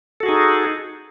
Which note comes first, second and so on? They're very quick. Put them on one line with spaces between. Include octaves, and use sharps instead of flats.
A4 F#4 G#4 D#4